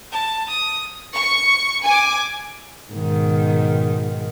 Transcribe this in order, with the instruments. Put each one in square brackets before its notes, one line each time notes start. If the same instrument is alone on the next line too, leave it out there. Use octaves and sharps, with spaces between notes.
[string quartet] A5
D#6
[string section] C#6 C#7
G#5 D6
[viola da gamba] G#2 B2 D#3